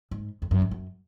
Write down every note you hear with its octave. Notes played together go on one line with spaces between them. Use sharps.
G#2
F2
F#2
G#2
F#2